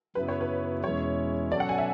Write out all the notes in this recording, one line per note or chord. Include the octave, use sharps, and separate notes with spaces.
F#2 C#3 F#3 B3 E4 B4
C#5
B4
E2 B2 G#3 C#4 E4 C#5
B2 F#3 C#4 F#4 A4 D5
F#5
G#5
E5